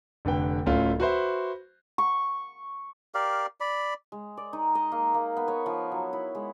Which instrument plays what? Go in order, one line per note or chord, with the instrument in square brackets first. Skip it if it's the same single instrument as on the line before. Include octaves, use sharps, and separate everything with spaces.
[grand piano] F1 D3 B4 G5
D1 A3 C#4 F4 F5
F#4 B4 C5 E5
[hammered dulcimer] C#6
[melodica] G4 A#4 D5 F5
D5 B5
[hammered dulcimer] G#3
D5
D#4
D#5
A#3
A#3
B3
C#5
F3
F#3
E4
G#3